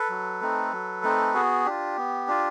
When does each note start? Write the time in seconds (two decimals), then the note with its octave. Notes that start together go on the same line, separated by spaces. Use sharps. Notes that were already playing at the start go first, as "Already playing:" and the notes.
Already playing: A4 B4
0.10 F#3
0.41 A3 C4 D#4
0.72 F#3
1.03 A3 C4 D#4
1.34 B3 F#4 G#4
1.66 D4 F4 G4
1.97 B3
2.28 D4 F4